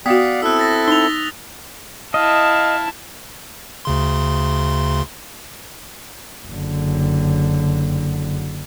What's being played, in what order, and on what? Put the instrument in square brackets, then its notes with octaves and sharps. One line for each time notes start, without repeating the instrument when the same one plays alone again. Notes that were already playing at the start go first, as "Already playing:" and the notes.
[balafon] B3 F#4 [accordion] D5 F5 F#5 [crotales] D#6 B6
[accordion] C4 E4 A4 [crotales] E6 F#6
[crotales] A6 A#6
[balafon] D#4 [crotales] F7 G7
[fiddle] E4 A5 [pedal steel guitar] D#5 [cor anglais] F5
[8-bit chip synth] D2 C#3 C6
[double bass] F#1 D3